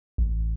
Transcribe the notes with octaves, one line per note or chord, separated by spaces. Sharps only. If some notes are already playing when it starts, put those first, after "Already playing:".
A1